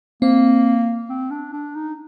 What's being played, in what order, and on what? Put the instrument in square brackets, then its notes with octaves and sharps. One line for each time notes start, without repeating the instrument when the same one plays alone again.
[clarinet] A#3 [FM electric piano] C4
[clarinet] C4
D4
D4
D#4